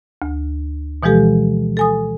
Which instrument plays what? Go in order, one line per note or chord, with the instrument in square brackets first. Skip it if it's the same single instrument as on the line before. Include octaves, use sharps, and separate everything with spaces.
[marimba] D2
B2 E3 F3 G#3 G4 A4
A4 G#5 D#6